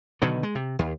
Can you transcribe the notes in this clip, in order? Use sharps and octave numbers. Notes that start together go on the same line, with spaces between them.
B2 D3 D#3 F#3
G#3
C3
D#2